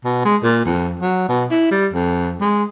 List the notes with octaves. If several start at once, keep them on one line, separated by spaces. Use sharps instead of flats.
B2
G#3
A#2
F2
F#3
B2
E4
G3
F2
G#3